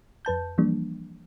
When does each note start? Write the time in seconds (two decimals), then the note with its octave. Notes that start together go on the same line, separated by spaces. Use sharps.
0.25 F2 B4 A5 G6
0.58 E3 F3 G3 A#3 D4